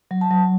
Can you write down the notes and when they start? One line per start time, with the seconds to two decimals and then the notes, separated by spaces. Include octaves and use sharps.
0.11 F#3
0.21 A5
0.31 F#3